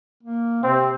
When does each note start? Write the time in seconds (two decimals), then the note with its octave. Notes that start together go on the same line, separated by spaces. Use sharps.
0.23 A#3
0.63 C3 C4